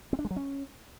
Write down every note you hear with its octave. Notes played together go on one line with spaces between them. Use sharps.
C4
D4
G#3
F#3
C#4